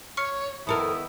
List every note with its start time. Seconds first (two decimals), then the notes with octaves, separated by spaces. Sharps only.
0.17 C#5 C#6 F6 C#7
0.67 F2 D#3 B3 E4 A4 A#4 D#6